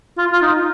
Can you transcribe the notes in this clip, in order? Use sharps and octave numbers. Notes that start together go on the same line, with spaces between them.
F4
F4
D#4